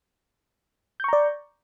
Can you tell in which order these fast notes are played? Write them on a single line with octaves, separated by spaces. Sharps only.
G6 C#6 A#5 D5